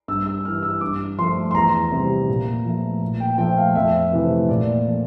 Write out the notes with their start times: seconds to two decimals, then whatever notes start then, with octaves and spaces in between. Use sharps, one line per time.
0.08 G2 E6
0.26 E6
0.45 E3 G3 F6
0.62 E6
0.81 G2 D6
1.18 F3 A3 C6
1.51 C6
1.54 E2 A#5
1.92 C3 G3
2.28 A#2
2.65 F3 A3
3.02 A#2
3.20 G5
3.38 F3 A3 G5
3.57 F5
3.75 F2 E5
4.12 C3 E3 A3
4.49 A#2 D5
4.86 F3 A3